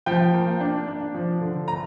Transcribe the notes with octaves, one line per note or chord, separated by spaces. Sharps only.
F3 G5
A#3
D4
D4
F3
D3
A#5